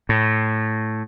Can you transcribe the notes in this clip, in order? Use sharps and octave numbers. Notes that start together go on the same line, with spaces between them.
A2